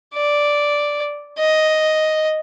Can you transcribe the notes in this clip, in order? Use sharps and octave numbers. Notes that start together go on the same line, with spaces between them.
D5
D#5